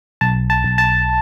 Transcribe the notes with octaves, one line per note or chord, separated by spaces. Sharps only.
B1 A5
A5
B1
A5